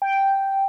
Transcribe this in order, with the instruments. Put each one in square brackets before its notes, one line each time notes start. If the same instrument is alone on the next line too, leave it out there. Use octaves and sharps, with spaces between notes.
[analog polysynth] G5